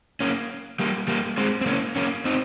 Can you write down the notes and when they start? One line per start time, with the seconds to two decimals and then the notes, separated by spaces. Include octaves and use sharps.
0.20 A#3 C#4
0.80 G3 A#3
1.08 G3 A#3
1.38 G#3 C4
1.61 C4
1.66 A#3 C#4
1.96 A#3 C#4
2.25 C4 D#4